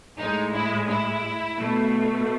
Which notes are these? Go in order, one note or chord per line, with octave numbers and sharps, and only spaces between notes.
A2 G#3 D#4
E4
E4
B2 A3